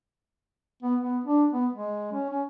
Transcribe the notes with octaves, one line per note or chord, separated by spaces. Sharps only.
B3
B3
D4
B3
G#3
C#4
C#4